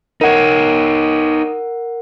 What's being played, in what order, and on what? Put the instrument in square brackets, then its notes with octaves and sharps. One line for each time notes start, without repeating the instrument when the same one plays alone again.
[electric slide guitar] D#4 C#5 [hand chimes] A#4 F#5